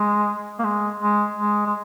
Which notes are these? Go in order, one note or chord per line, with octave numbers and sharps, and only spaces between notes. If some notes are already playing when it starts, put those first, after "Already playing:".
Already playing: G#3
A#3
G#3
G#3
G#3
G#3